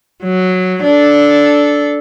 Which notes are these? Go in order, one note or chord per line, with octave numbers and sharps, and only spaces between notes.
F#3
D4 A4